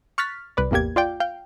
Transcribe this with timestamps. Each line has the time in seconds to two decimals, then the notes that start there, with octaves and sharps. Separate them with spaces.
0.18 C#6 F6 F#6 A6 B6
0.57 C2 B4 D5
0.71 A1 E2 A#3 G4 G#6
0.96 F4 D5 G5
1.20 F5 G5